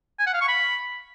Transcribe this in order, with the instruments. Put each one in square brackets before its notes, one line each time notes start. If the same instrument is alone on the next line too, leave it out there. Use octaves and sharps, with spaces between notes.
[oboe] G#5
F#5
F5
C#6
B5